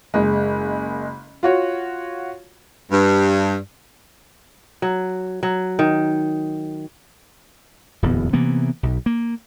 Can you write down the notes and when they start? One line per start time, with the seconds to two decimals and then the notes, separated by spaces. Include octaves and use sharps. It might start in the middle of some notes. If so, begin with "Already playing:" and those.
0.14 F#1 G#3
1.43 F4 F#4 C#5
2.91 G2
4.82 F#3
5.43 F#3
5.79 D#3
8.02 D1 E2 A#2 B3
8.33 C3 E3 A#3 B3
8.83 B1
9.06 A#3